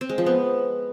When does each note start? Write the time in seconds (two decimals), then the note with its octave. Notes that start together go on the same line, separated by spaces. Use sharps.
0.01 C4
0.09 G#3
0.18 F3
0.26 B3